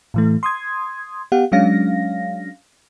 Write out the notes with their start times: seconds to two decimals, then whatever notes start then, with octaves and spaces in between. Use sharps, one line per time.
0.14 A2 E3 A3
0.43 C6 D#6 G#6
1.32 B3 G4 F5 F#5
1.52 F#3 G#3 C#4 D4 F5 A#6